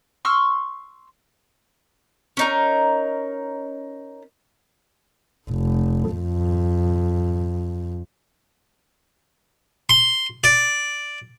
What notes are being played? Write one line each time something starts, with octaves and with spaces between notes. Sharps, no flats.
C6 C#6 E6 F6
C#4 D#4 A#4
F1
F2
C6
D5